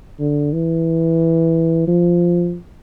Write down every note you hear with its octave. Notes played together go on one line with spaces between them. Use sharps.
D3
E3
F3